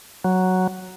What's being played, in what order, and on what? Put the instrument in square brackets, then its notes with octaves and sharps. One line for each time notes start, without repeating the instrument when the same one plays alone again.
[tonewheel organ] F#3